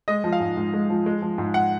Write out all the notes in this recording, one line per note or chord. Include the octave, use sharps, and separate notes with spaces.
G#3 D#5
F3
F5
G#2
G#2
G#3
F3
G#3
F3
G#2
F#5